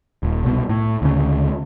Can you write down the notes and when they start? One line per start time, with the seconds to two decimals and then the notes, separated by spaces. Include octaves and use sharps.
0.23 D#1
0.44 C2 B2
0.69 A2
1.02 D2 C#3